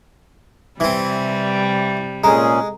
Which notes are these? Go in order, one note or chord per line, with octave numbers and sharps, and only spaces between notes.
C3 E3 G3 C4
A#2 G#3 C#4 G#4 A4 G#5 A#5